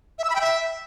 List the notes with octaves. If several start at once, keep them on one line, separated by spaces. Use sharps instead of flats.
E5
E6
B5
G5
E5